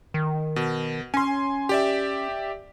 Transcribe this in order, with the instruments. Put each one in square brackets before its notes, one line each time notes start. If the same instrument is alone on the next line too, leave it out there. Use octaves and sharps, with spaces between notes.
[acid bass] D#3
[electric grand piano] B2
[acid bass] C#4 [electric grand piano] G#5 C6
[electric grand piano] G4 D5 E5